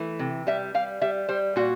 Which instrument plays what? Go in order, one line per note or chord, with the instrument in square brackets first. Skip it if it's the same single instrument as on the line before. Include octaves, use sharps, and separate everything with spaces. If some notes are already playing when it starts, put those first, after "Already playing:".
Already playing: [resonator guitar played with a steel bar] E3 A3
C3
G3 E5
G3 F5
G3 E5
G3 C5
A#2 F#4